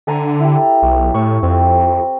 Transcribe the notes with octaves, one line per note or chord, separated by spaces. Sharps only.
D3 A4 G#5 A#5
E4 G4
B1
A2 C#6
F2 C4